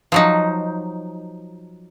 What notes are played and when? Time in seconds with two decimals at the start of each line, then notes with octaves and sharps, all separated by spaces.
0.12 F3 F#3 D#4